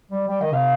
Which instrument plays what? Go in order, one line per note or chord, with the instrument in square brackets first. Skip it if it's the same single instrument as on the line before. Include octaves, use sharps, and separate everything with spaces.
[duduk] G3
[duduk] G3 [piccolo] G5
[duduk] D#3 [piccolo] D#5
[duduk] C3 [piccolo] F5